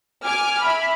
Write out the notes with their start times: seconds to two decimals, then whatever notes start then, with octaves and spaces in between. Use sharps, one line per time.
0.23 G#5 D6 F6
0.61 E5 B5